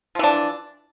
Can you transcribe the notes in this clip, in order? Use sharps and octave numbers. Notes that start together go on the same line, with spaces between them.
E3 F3 D4